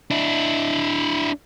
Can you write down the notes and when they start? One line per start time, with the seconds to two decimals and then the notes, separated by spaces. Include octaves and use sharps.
0.11 D4 E4